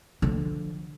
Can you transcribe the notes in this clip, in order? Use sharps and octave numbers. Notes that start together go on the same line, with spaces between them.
D3 F3